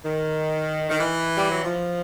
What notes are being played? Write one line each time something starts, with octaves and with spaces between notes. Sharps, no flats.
D#3
D#3
E3
G3
F#3
F3